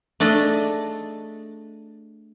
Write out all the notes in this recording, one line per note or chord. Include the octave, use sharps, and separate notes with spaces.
A3 D4 G#4 D5 D#5